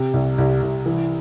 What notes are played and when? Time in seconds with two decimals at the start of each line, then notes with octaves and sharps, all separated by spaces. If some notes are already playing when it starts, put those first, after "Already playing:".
Already playing: C3
0.14 C2
0.38 C2
0.62 C2
0.86 E3